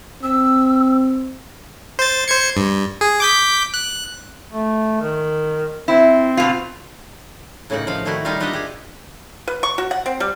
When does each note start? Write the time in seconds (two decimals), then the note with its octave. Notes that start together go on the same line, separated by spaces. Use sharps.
0.23 C4 E6
1.99 C5 A6
2.28 C5 G#6 C#7
2.57 G2
3.01 G#4
3.20 D6 G6 B6
3.74 F#6
4.52 A3
5.00 D#3
5.88 C4 E4
6.37 B2 F4
7.70 A2 C#3 A#3 D#4 F#5
7.87 F3 D#4 F5
8.05 A#2 D#3 A3 E4 F#4
8.25 G3 D#4 F4 G4 A#4 F5
8.40 D4 F4 G4 D#5 E5 F#5
8.53 G4 G#4
9.48 B4
9.63 C#6
9.78 F#4
9.91 F#5
10.06 C4
10.20 G3